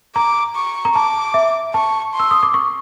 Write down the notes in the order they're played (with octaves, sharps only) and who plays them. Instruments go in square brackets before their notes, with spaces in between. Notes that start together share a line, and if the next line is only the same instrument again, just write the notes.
[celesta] A#5 [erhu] D6
[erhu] C#6
[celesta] A#5
[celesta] A5 [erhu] D6
[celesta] E5
[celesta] A5 [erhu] C#6
[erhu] C6
[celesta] E6
D#6
D6
C#6